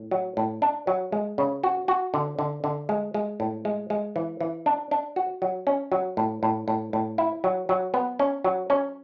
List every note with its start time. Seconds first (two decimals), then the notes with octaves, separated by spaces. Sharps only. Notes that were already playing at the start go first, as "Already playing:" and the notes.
Already playing: A2
0.11 F#3
0.37 A2
0.62 D4
0.87 F#3
1.12 G#3
1.38 C#3
1.64 F#4
1.88 F#4
2.14 D3
2.39 D3
2.64 D3
2.89 G#3
3.14 G#3
3.40 A2
3.65 G#3
3.90 G#3
4.16 E3
4.41 E3
4.66 D4
4.91 D4
5.16 F#4
5.42 F#3
5.67 C#4
5.92 F#3
6.17 A2
6.43 A2
6.68 A2
6.93 A2
7.18 E4
7.44 F#3
7.69 F#3
7.94 B3
8.19 C#4
8.44 F#3
8.70 C#4